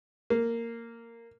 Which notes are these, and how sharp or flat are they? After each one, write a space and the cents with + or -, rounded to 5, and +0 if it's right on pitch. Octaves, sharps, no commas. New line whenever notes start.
A#3 -10